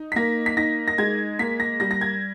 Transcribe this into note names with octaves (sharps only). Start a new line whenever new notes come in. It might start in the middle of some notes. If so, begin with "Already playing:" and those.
Already playing: D#4
B6
A#3 A#6
B6
D#4 A#6
A#6
G#3 G#6
A#3 B6
A#6
G3 A#6
A#6
G#6